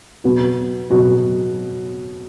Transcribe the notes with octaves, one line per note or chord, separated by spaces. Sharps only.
B2 F#3 B3 F#4
B2 F#3 B3 F#4